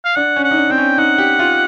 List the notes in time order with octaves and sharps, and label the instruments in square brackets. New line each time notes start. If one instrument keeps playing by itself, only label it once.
[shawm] F5
[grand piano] D4 [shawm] F#5
[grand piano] C#4
[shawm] F#5
[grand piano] D#4
D4
[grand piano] C4 [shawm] G5
[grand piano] C#4
[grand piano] D#4 [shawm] F#5
[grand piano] G4
F4